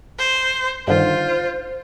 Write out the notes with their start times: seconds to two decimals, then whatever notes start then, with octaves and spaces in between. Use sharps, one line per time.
0.19 C5
0.88 G2 D3 D#3 F4 C5